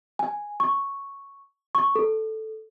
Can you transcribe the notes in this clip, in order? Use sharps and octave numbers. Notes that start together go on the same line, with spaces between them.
G#5
C#6
C#6
A4